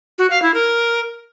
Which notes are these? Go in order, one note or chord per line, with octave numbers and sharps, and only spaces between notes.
F#4
F5
E4
A#4